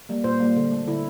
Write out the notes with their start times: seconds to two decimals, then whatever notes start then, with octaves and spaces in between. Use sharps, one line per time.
0.09 G3 A#3
0.24 A#2 C5
0.40 G3 A#3
0.56 D3
0.71 A3
0.87 D3 E4